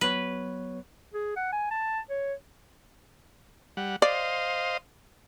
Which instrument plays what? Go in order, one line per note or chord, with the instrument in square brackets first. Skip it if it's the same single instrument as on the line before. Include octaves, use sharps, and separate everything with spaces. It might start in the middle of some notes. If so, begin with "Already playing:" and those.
[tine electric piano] F#3 B3 C#5 [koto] B4
[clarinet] G#4
F#5
G#5
A5
C#5
[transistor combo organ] G3 F#5
[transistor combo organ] C5 D#5 F5 [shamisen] D5